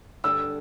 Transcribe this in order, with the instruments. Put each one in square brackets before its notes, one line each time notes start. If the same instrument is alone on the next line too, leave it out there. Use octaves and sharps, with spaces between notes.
[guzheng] G2 D3 G3 D4 [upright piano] E6